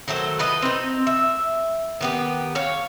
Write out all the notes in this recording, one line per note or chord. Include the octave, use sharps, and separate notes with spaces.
D#3 F#3 A3 C5
F4 B4 D#5
C4 D#4
E5
D#3 B3 G4
C#5 F5